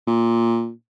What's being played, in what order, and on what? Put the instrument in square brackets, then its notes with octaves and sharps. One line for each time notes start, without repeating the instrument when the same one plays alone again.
[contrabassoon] A#2